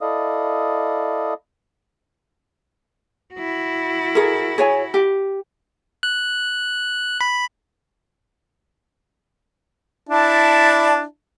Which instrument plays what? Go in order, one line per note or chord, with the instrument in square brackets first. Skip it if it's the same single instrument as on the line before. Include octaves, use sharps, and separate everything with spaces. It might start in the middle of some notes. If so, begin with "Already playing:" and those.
[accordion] E4 A4 D5 D#5 F5 D#6
[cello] E4 F#4
[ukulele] G#4 A#4
G#4 C#5 G#5
G4
[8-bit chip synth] F#6
B5
[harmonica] D4 E4 A5